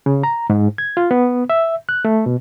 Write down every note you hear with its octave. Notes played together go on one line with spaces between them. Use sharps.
C#3
A#5
G#2
G#6
F4
B3
E5
F#6
A3
B2